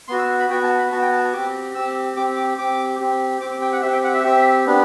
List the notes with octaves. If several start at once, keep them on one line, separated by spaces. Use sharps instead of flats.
B3 F#4 C6
E6
B5
B3 F#4 G5
A5
B5
B3 F#4 A5
G5
A5
C4 G4 D6
C4 G4 E6
C4 G4 D6
D6
C4 G4 D6
C4 G4
C4 G4 D6
D6
G5
F#5
C4 G4 E5
G5
F#5
E5
C4 G4
B3 D4 G4